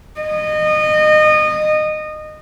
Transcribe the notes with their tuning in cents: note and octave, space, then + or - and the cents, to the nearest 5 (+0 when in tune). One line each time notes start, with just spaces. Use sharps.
D#5 -25